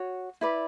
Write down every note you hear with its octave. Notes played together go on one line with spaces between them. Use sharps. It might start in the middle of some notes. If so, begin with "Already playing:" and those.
Already playing: F#4 C#5
E4 B4 D5